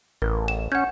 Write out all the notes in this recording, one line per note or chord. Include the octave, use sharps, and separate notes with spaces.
A1 A#4
E7
C#4 F#5 G6